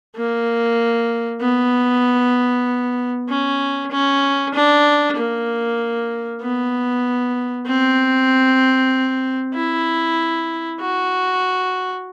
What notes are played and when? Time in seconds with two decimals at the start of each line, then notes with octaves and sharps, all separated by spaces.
0.16 A#3
1.41 B3
3.29 C#4
3.91 C#4
4.54 D4
5.17 A#3
6.42 B3
7.67 C4
9.55 E4
10.80 F#4